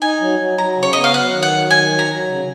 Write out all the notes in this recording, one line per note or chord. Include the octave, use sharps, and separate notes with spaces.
D#4 G#5
F#3
F#3
F#3 A#5
C#3
C#5
B3 D#5
F5
F#3 F#5
D#3
F#5
F#3
D#3 G#5
F#3
A#5
F#3
C#3